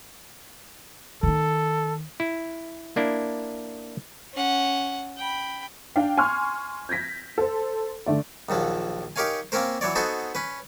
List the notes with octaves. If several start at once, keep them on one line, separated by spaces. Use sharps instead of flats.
D#3 D#4 A4
E4
A#3 D4 E4
C#4 F#5
G5 B5
D4 F5 G5
G#5 C6 C#6 F6
G6 G#6 A#6 B6
A4 C5
D3 A3 D5
A#1 D#2 F3 F#3
D#4 G4 A#4 C#5 F5 G#5
A#3 C4 C#4 A#4 C5
E3 F#3 C#5 D5
B3 D#4 F#4 A4 C5 G#5
C#4 B4